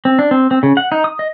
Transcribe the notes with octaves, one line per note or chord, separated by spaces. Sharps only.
C4
D4
C4
C4
C#3
F#5
D#4
D#6
D#5